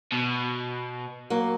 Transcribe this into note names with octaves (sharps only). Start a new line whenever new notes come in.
B2
F#3 A#3